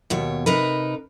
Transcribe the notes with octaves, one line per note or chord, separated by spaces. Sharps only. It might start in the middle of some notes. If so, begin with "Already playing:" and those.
D#2 B2 C#5
C3 D#4 A#4 B4